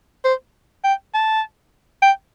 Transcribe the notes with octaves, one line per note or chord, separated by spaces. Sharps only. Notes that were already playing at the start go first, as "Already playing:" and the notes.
C5
G5
A5
G5